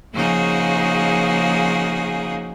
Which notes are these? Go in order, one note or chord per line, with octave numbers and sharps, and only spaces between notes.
C#3 F3 A#3 D#4 F#4 G#4